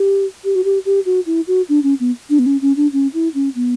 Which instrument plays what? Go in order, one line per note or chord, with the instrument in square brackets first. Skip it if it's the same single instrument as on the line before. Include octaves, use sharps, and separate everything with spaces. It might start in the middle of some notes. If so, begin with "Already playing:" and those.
Already playing: [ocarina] G4
G4
F#4
G4
G4
F#4
E4
F#4
D4
C#4
B3
D4
B3
C#4
C#4
D4
C#4
E4
C#4
B3